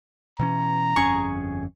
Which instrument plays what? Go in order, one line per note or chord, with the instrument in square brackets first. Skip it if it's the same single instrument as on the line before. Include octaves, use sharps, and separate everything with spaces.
[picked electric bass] B2 E3 C#4 [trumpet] A#5
[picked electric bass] G1 F2 C#4 [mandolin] G#4 C#6